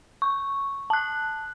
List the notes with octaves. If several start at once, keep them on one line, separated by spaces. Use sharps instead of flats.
C#6
A5 F#6